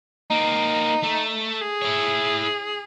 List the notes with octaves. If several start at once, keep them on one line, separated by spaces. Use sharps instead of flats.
A#3 C4 D#4
A3
G#4
E4 C#5